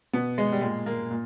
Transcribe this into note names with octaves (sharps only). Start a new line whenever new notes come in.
B2 B3
G#3
G3
A#2 G#3
A#3
A#2